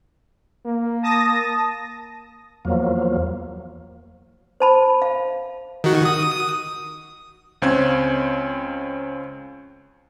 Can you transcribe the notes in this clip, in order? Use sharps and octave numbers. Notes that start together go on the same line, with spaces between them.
A#3
A5 D#6 A#6
E2 F3 F#3 A#3
C5 A5 B5
F5
D#3 F#4
D#6
C#2 C4 C#4 G#6